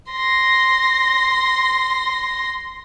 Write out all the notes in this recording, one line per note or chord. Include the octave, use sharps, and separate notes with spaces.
C6 A#6